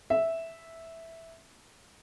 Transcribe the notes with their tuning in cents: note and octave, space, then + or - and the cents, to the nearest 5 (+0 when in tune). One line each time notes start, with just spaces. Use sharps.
E5 -5